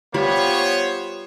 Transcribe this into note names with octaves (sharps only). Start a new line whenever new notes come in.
G3 B3 F4 C5 C#5 B5